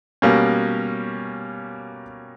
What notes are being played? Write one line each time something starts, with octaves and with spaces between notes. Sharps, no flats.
B2 G3 A#3 C#4